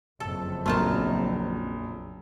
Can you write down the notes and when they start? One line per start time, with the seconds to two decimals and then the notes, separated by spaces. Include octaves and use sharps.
0.20 F#1 F2 A4
0.66 A#1 F#3 A3 B3 F4 A#4 A5